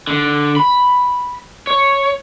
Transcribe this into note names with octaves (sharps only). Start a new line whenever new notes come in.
D3
B5
C#5